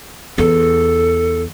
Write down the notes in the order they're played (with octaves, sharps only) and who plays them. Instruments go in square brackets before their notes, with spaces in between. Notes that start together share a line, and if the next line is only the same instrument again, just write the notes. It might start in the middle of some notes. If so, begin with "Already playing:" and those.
[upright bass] E2 [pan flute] A4